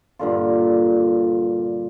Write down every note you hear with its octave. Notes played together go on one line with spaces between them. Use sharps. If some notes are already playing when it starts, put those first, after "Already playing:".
G2 A#2 D3 F4